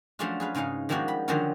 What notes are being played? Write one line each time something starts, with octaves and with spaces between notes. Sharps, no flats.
F3 F#3 A3 C#4 D4 F4
G#4 B4 F5
G#2 C#3 G#3 D#4 F5
D#3 F3 G3 G#3 A#3 F#4
B5
D3 D#3 F3 F#3 C#4 F4